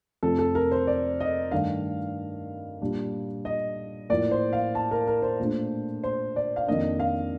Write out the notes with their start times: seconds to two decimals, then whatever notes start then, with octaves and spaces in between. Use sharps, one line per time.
0.23 F2 C3 F3 A3 C4 A4
0.39 A4
0.55 A#4
0.71 C5
0.87 D5
1.20 D#5
1.51 G2 D#3 A3 D4 F5
2.81 A#2 G3 D4
3.45 D#5
4.09 A2 F3 A#3 D5
4.31 C5
4.53 F5
4.75 A5
4.91 A#4
5.07 A#4
5.22 C5
5.40 A#2 A3 D4
6.04 C5
6.36 D5
6.56 F5
6.67 F2 D#3 A#3 D4 D#5
7.00 F5